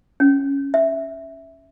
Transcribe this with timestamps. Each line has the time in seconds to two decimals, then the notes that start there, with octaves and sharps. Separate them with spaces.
0.20 C#4
0.74 E5